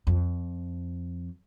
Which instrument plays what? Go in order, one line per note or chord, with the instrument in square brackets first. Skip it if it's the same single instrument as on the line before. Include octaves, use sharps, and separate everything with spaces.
[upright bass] F2